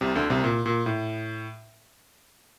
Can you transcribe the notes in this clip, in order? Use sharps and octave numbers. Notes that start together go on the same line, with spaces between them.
C2 C3
D2 D3
C2 C3
A#2
A#2
A2